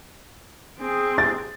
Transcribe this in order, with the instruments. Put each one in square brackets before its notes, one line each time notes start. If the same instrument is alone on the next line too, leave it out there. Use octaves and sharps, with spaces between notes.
[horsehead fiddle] C4 G#4
[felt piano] A6